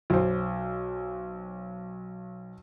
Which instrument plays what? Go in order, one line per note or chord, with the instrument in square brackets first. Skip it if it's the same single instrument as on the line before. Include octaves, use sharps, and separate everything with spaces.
[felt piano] B1 C5